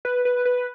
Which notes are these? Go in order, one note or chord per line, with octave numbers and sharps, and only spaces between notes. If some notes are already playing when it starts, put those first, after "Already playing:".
B4
B4
B4